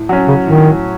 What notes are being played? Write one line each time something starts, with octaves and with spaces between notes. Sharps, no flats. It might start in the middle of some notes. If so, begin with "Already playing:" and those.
Already playing: A2
F#3 C#4
C#3
A2 D#3